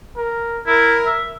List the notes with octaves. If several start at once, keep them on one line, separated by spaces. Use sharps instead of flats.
A#4
E4 A#4
E5